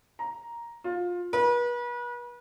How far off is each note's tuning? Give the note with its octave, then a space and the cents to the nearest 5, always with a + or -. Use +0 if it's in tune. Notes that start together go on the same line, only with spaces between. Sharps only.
A#5 +5
F4 +20
B4 -35